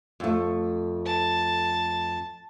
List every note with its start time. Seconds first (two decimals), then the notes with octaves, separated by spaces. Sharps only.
0.20 F2 A3
1.06 A5